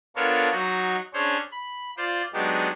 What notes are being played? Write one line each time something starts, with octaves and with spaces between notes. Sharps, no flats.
B3 D4 F4 A4 A#4 C#5
F#3 D#4 F#4
C#4 D4 G#4 C5 C#5
B5
F4 C5 D5
F#3 G#3 B3 D4 D#4 G4